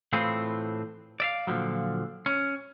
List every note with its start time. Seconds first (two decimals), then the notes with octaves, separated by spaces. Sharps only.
0.13 A2 E3 C4 F4 G#4
1.20 D5 E5 F5
1.47 A#2 D3 F3 F#3
2.26 C#4